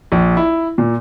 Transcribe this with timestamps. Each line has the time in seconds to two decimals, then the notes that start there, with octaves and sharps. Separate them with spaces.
0.12 A#1
0.37 E4
0.78 A#2